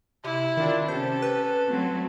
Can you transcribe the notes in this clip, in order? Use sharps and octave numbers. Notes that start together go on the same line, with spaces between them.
C3 E4
D#3 D4 F4
C3 C#4 G4 A4 C5
B4
F#3 A3 C4